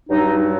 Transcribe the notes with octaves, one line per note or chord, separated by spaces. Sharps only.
G2 F#3 D#4